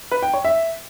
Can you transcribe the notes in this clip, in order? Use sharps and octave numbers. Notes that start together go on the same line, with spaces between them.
B4
G5
C#5
E5